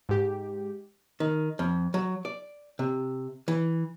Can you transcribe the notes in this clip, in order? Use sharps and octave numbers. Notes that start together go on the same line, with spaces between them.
G#2 G4
D#3
F2
F#3
D5
C3
E3